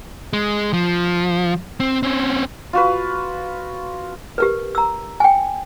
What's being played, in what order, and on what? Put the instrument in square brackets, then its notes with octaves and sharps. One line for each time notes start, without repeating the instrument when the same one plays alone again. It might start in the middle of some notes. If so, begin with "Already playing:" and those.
[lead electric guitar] G#3
F3
C4
C4 C#4
[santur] F4 F#4 B4
[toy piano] G4 A#4 B4
A#5 E6
G5 G#5